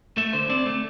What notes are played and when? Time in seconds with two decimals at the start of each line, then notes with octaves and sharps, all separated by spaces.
0.17 A3 E5
0.33 D3 C5
0.49 C4 D5
0.66 A3